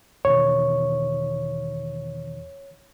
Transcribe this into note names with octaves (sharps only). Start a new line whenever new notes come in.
E2 B2 D#3 C#5